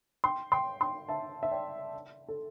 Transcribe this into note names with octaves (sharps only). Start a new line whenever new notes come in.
G5 C6
G5 C6
G5 C6
E5 A5
E5
D5 G5
A4